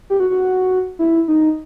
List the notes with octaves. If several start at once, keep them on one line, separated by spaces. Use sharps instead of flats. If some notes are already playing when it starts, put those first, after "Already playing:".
G4
F#4
F#4
E4
D#4